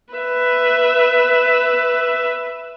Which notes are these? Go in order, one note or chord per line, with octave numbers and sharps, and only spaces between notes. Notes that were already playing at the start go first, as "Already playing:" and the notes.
B4 E5